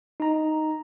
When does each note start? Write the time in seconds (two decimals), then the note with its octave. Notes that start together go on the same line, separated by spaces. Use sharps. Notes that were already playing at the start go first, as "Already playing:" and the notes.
0.20 D#4 A#5